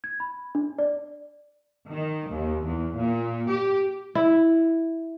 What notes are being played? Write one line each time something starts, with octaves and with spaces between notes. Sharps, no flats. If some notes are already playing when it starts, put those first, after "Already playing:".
G#6
B5
D4
D5
D#3
D#2
E2
A#2
G4
E4